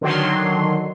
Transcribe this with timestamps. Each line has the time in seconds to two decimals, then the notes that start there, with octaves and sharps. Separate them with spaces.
0.01 D3 D#3 F#3 C6